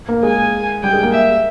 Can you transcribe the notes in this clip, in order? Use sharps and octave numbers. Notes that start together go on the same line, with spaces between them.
A#3
G#3 G#5
G3 G5
G#3
A#3
E5